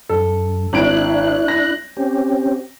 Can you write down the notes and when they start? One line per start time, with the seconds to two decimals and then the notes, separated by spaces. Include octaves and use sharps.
0.09 F#2 A4
0.73 G#1 D4 E4 F#6 D7
1.48 A#6
1.97 C4 C#4 G4